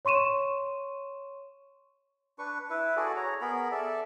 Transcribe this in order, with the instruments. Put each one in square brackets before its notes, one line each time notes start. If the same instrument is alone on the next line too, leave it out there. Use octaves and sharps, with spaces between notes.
[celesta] C#5 C6 C#6 D#7 E7
[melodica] D4 B4 C#6
E4 B4
F#4 G#4 A4 D5
C#5 A#5
B3 G#4 A#4 B5
A4 D5 E5